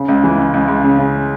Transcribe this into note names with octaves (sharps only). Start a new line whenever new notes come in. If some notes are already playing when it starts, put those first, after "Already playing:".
Already playing: C#3
C#2
E3
C#2
C#2
C#2
C#3
C#3